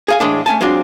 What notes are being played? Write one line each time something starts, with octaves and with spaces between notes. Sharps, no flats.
G#4 F5 G#5
A2 E3 G#3 D4
A3 C#4 G#5 A5
F#3 G#3 C4 D4 F4